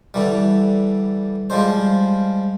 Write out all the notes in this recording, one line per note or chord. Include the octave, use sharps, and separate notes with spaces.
D3 E3 G3
F3 G3 G#3 C5